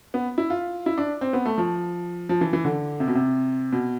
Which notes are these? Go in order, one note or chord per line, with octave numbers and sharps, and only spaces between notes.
B3
E4
F4
E4
D4
C4
B3
A3
F3
F3
E3
E3
D3
C3
B2
C3
B2